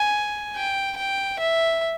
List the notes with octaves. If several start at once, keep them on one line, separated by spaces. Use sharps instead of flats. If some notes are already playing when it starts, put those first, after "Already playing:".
Already playing: G#5
G5
G5
E5